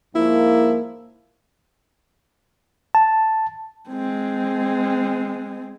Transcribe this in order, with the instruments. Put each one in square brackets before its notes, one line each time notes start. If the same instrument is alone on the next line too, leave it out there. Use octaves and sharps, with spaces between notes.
[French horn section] G#2 F3 A#3 [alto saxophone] E4
[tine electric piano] A5
[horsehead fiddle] G#3 C4